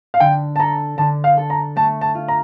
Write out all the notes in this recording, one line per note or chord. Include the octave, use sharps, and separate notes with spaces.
F5
D3 G5
A5
A4 A#5
D3 A5
F5
A4
A#5
A3 A5
A5
F4
A#5